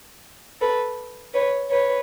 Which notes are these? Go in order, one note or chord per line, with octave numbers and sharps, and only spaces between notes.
A4 B4
B4 C#5
B4 C#5